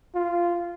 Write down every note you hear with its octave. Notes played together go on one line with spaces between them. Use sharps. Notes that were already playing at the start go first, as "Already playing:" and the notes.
F4